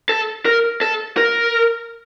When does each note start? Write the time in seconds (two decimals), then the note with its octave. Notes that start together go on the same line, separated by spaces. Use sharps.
0.09 A4
0.46 A#4
0.81 A4
1.17 A#4